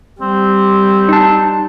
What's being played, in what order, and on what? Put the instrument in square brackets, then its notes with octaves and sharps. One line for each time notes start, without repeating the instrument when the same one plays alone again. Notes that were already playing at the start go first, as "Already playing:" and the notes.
[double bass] G3 [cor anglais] C4
[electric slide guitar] D#4 A5